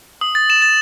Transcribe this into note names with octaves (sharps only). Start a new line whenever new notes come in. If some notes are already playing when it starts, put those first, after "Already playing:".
D#6
A6
E7
A6